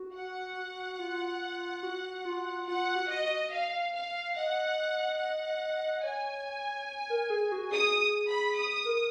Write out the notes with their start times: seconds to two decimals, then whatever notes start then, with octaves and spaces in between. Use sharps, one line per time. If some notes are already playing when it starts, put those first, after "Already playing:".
Already playing: F#4
0.14 F#5
0.99 F4
1.83 F#4
2.25 F4
2.67 F4 F#5
2.96 F#4
3.09 D#5
3.52 F5
3.93 F5
4.36 D#5 F#5
5.20 F#5
6.04 C#5 G#5
7.10 A#4
7.30 G#4
7.52 F#4
7.72 G#4 D#6
8.28 B5
8.57 D#6
8.85 A#4